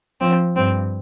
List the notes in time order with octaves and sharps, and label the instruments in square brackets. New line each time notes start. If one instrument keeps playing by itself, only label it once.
[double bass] F3 [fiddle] C4
[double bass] G2 [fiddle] C4